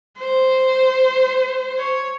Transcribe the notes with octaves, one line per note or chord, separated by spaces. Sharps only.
C5
C#5